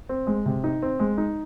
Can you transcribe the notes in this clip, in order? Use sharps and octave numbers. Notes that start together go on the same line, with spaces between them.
C4
G#3
C3
D#4
C4
G#3
D#4